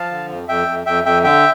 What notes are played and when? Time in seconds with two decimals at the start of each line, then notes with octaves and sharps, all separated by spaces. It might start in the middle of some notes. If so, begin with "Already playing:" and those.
Already playing: F3 F5 A5
0.11 D3
0.30 F2
0.48 F2 E5 G5
0.68 F2
0.86 F2 E5 G5
1.05 F2 E5 G5
1.24 D3 E5 G5